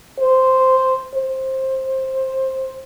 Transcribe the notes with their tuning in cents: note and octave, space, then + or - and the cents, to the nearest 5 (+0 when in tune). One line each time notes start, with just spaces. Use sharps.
C5 -5
C5 +15